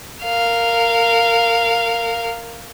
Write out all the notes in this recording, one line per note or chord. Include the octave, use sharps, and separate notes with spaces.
A#4 F5